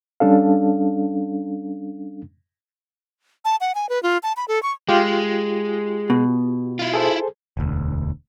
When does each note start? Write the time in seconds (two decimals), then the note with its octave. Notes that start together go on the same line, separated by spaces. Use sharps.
0.20 G3 C#4 D4 A4 F5
3.45 A5
3.61 F#5
3.75 G#5
3.89 B4
4.03 F4
4.23 A5
4.37 B5
4.48 A4
4.63 C#6
4.89 G#3 F4 G4
6.10 B2
6.79 E4 F4
6.94 G#4 A4 C5
7.57 E1 D2